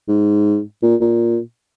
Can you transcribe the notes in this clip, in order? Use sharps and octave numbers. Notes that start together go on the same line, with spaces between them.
G#2
A#2
A#2